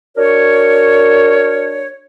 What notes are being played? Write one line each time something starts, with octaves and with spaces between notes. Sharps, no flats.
D4 F#4 A#4 C#5